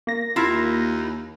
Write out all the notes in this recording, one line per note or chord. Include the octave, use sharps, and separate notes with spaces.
A#3 A#6
D#2 E4 F4